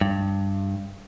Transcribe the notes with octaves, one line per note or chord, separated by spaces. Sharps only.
G2